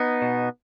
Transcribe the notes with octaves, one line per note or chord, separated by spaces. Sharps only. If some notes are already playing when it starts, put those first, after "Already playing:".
Already playing: B3 D#4
B2